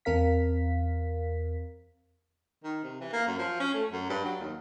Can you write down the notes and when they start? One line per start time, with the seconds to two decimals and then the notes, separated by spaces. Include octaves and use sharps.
0.05 E2 C4 A#4 F5 B6
2.64 D#3
2.83 C3
3.01 E3
3.13 A#3
3.27 F#2
3.39 F3
3.60 C#4
3.74 A3
3.91 F#2
4.09 G2
4.25 F#3
4.40 D#2